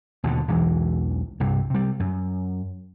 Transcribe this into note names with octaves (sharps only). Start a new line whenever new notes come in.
D#2 B2 D3
B1 E2 E3 G#3
C2 G2 C3
C3 G3
F#2